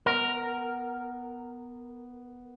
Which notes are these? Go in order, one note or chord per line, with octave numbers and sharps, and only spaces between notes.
B3 A#4